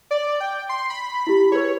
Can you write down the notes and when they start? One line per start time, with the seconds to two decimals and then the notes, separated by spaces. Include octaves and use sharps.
0.11 D5
0.40 G5
0.69 C6
0.90 B5
1.27 E4 G4
1.52 G#4 B4 C#5